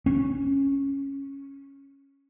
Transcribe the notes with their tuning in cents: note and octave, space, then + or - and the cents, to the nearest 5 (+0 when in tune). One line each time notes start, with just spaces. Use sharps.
C#4 -5